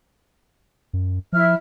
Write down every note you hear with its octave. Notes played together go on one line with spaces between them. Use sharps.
F#2
F3 E4 E5 F6